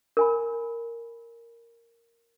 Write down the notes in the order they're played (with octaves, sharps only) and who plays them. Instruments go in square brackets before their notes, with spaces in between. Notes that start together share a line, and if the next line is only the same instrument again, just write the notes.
[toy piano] A#4 G#5 B5